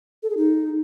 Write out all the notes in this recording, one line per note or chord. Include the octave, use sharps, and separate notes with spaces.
A4
G#4
D#4